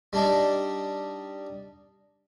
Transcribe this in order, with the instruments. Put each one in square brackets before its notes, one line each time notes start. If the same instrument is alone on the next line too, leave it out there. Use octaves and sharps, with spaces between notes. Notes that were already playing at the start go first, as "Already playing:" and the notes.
[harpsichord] G3 D4 D#4